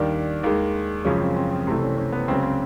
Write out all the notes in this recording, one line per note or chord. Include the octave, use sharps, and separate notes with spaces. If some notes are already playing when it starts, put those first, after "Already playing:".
Already playing: D#2 D#3 G3 D4
D#2 D#3 G#3
F#2 C#3 F3 G#3 C#4
C4
C4
C4
C2 C3 E3 A3 C4
C#4
C#4
B3
C#2 C#3 F#3 C4
C4